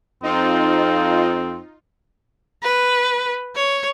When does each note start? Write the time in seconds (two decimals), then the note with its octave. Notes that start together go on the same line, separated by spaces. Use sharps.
0.23 F2 C4 D#4 F4
2.63 B4
3.55 C#5